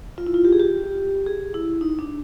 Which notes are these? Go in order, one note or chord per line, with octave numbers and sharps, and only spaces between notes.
F4
E4
F4
G4
G#4
G4
G#4
E4
D#4
D4